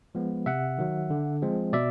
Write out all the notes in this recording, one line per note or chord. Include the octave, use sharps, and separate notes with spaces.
F3 G#3 B3
C3 E5 F#5
D#3 F#3
D3
F3 G#3 C4
B2 D5 E5